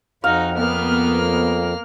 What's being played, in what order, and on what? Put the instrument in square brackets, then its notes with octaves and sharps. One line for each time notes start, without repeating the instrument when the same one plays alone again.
[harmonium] F2 [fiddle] D#4 F#4 [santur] F5
[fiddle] A#3 F6 [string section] B3